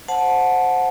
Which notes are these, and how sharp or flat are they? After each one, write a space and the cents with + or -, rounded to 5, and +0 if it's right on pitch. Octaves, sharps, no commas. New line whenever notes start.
C5 +0 F#5 -15 A5 -15